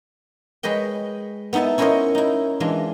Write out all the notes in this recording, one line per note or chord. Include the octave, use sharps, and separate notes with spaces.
G#3 B4 C#5 D#5 G5
B3 D#4 E4 E5 A5
C#4 E4 A#4 C5 C#5 D#5
D#4 E4
E3 G#3 D4 F4